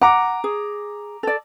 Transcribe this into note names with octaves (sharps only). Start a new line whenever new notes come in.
F#5 A#5 D6
G#4
A4 D5